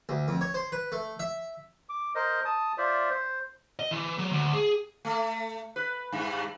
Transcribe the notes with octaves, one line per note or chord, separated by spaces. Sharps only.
D2
F2
C#5
C5
B4
A3
E5
D6
A#4 C5 D#5
A5 D#6
F4 C5 D5 E5
C5
D#5
E3
F#3
D2
G#4
A3
B4
G2